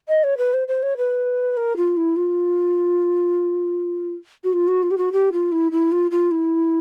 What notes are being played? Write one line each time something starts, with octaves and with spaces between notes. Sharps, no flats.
D#5
C#5
B4
C5
C5
C#5
B4
A#4
F4
E4
F4
F#4
F4
F#4
F4
G4
F#4
G4
F4
E4
E4
F4
F4
E4